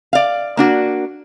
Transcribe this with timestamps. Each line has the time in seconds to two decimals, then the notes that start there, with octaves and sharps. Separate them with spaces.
0.13 D5 F5
0.57 A#3 D4 F#4